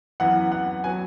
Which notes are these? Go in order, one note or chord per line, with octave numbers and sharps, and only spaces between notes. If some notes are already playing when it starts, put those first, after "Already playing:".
F#2 E3 B3 F#5
F#5
F#3 B3 G#5